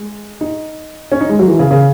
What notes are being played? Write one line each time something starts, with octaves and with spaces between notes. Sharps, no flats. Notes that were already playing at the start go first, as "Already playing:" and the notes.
Already playing: G#3
D#4
C#4
D#4
G#3
F#3
E3
C#3
C#3